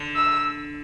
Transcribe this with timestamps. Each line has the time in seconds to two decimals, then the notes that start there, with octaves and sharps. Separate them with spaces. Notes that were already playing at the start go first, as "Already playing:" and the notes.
Already playing: D3
0.15 E6